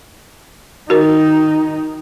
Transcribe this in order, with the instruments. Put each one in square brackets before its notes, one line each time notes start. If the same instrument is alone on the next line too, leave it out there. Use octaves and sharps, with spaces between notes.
[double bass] D#3 D#4 [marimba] F#4 A#4